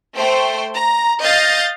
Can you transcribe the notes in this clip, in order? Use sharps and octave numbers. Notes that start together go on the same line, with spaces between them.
A3 C5 G5
A#5
D#5 F5 G6 A6 A#6